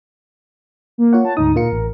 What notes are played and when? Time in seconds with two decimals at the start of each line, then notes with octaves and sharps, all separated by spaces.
0.98 A#3
1.13 F4 C#5 F#5
1.25 A5
1.37 D2 G#2 D#4 D#6
1.56 A#2 F4 A#4 C#7
1.72 A1